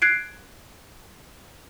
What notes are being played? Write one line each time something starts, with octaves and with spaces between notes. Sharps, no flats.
F#6 G#6 C7 D7